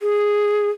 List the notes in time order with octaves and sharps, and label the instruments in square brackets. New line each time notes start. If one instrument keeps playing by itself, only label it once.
[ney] G#4